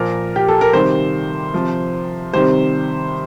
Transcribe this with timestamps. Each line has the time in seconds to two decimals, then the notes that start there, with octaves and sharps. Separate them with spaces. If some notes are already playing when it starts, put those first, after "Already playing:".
Already playing: A#2 F3 A#4
0.36 G4
0.48 A4
0.61 A#4
0.73 C3 D#3 G3 C5
1.54 C3 F3
2.33 C3 D#3 G3 C5